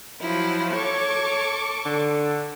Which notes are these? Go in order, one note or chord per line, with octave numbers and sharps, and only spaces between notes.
F3 F#3 E4
A4 C#5 C#6 D6
D3